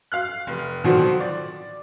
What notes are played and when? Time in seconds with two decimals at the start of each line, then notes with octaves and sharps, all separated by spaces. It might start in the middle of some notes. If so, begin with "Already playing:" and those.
0.12 F5 F6 F#6
0.47 F1
0.84 B2 D3 D#3 F3 F#3 C4
1.20 D5